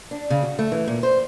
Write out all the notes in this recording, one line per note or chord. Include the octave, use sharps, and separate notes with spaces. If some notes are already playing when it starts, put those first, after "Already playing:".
D4
C#3
F#4
A3
E3
A#2
C5